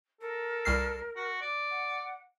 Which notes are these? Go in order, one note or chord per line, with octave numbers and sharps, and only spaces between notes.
A4 A#4
C2 F6 C7
F#4
D5
F#5